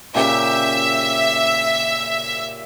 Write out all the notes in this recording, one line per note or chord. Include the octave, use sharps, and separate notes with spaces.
A#2 C#3 G4 E5